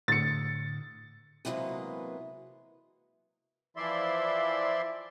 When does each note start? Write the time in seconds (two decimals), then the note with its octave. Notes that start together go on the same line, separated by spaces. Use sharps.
0.08 A2 D3 A6 C#7
1.45 C3 E3 F#3 G#3 A#3 B3
3.77 E3 F3 E4 D5 E5 C6